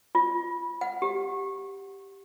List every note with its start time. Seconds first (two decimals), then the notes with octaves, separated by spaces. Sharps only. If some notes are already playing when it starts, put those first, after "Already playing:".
0.15 F4
0.81 F#5
1.02 G4